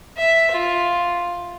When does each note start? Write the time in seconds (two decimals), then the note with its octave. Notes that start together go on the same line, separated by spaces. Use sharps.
0.17 E5
0.51 F4